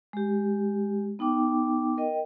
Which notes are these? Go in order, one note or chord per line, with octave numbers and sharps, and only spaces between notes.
G#3 G4
B3 D#4 G5 D6
A#4 D#5 G5